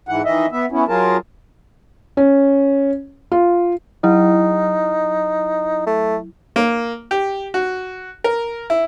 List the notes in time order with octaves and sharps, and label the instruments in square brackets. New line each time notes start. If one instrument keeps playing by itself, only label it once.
[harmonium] G#2 E3 F#5
D#3 E3 D#5 E5
B3 E5
B3 C#4 E4
F#3 F4 G#4 A#4 A5
[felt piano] C#4
F4
[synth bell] F#3 E4 [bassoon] D#4
[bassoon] A3
[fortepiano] A#3
G4
F#4
A#4
E4